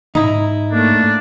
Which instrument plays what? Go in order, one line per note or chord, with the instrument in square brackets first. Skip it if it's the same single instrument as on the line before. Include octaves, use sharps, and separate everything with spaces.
[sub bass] G#2 [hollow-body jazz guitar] D#4 E4
[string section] A2 A3 A#3 [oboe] D4